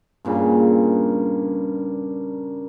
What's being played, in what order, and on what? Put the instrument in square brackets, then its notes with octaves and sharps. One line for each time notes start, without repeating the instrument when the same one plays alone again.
[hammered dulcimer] G2 A#2 C#3